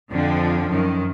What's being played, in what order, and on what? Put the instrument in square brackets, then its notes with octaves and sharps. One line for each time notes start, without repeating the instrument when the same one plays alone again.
[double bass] F2 [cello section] D3 F3
[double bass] F#2 [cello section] D#3